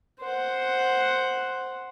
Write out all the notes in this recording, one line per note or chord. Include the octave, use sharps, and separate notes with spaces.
C5 F#5